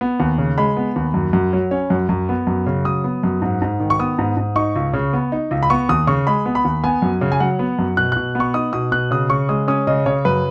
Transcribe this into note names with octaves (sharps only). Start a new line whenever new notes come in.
B3
D#2
C#3
G#3 B5
B3
D#2
F#2
F#2
F#3
C#4
F#2
F#2
B3
F#2
C#3
F#3 D#6
B3
F#2
G#2
G#2
D#3
C#6
B3 D#6
G#2
G#2
D#4 C#6
C#2
C#3
B3
D#4
C#2
B5
B3 C#6
D#2 D#6
C#3 C#6
G#3 B5
B3
B5
D#2
B3 G#5
F#2
C#3
G#5
F#3 F#5
B3
F#2
B2 F#6
B2 F#6
B3
C#6
D#4 D#6
B2 D#6
B2 F#6
C#3 D#6
C#3 C#6
G#3 D#6
C#4 D#6
C#3 D#5
C#3 C#5
F#2 B4